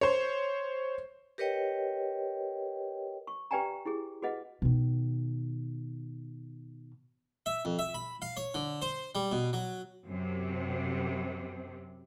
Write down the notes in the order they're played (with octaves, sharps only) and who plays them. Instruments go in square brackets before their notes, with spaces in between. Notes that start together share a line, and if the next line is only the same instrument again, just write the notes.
[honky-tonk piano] C5 C#5
[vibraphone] G4 A#4 B4 C#5 D#5 G5
[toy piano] C#6
G4 B4 D5 G5 G#5 A#5
E4 G4 G#4
F#4 G#4 B4 D#5 F#5
[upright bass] B2 D#3
[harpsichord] E5
F2
E5
B5
F5
C#5
D3
C5
G3
B2
F#3
[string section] F#2 C3